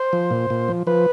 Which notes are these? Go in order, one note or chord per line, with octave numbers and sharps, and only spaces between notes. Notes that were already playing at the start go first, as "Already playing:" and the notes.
Already playing: C5
F3
A#2
A#2
F3
F3 B4